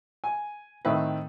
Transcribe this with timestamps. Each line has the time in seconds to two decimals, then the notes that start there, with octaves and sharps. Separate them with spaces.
0.24 G#5
0.85 A2 D#3 A3 C4 B4